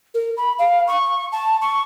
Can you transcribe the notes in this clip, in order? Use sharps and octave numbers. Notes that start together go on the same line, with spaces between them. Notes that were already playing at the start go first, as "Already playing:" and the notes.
A#4
B5
F5
C#6
A5
C#6